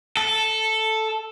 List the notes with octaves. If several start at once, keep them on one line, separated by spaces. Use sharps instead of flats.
A4